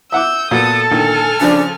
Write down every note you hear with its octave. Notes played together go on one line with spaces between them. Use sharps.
E5 F#5 D6 E6 G6
A#2 B3 F#4 A4 D#6
A#2 D3 D#3 G#5 F6
C#3 F3 D4